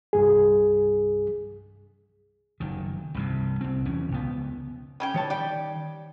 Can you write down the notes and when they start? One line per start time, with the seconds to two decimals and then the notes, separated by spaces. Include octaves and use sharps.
0.13 C2 G2 G#4
2.60 F#1 D#3
3.15 C2 G2 C3
3.61 C2 C4
3.85 B1 E2 C#4
4.12 C#2 B3
5.00 G3 C#4 G5
5.14 D#3 C#5 A5
5.30 G3 D5 G5